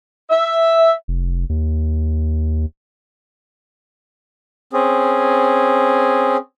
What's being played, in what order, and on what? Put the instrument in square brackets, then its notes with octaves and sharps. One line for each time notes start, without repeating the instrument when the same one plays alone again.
[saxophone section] E5
[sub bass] F1
D#2
[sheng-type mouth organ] C4 C#4 G#4